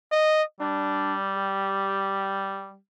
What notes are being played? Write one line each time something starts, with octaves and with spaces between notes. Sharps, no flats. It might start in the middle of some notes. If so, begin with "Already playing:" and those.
D#5
G3 D4
G4